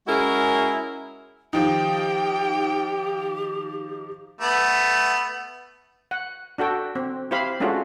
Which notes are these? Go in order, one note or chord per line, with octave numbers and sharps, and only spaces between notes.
G#3 C#4 E4 F#4 G#4 A#4
D#3 F3 D#4 G4 G5
A3 B3
F#5
D4 F#4 A4 G5
C4
E4 G4 C5 F5 B5
G#3 A3 C#4 D4 F4 F#4